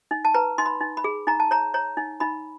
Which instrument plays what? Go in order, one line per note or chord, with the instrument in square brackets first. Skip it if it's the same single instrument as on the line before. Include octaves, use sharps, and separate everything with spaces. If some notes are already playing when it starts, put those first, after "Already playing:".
[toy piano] D#4
A5
B4 A#5
D#4 C6
B5
D#4
B5
G#4
D#4 A#5
A5
C#5 A#5
C#5 A#5
D#4
D#4 B5